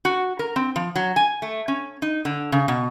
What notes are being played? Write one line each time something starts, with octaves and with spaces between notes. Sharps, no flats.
F#4
A#4
C4
F3
F#3
G#5
A3
C#4
D#4
D3
C#3
B2